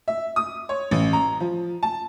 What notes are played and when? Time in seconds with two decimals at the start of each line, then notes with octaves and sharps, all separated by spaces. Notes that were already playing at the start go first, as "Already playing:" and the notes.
0.08 E5
0.36 D#6
0.69 C#5
0.91 A1
1.13 A#5
1.40 F3
1.83 A5